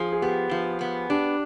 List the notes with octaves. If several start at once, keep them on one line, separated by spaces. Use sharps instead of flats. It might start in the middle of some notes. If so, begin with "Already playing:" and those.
Already playing: F3 G#4
G#4
B3 G4
F3
B3
D4 G4